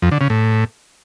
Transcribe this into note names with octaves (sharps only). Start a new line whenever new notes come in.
F2
D3
C#3
A2